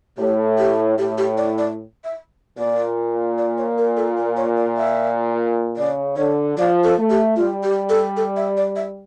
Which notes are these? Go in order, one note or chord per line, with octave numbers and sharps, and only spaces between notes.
A2 G4
G4
A2 G4
G4
D5
D5
E5
A#2 D5
D5
C#5
A#4
A4
A#4
C#5
D5
E5
C#3 D5
D3 C#5
F3 D5
A4
A3
G4
G3 F4
G4
A4
A4
E5
D5
E5